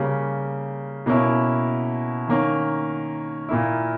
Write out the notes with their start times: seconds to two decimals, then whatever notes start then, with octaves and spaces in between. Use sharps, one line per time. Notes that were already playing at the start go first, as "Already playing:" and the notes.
Already playing: C#3 G3 A#3
1.06 B2 A#3 C#4 E4
2.28 D#3 A#3 C#4
3.49 A#2 A#3 E4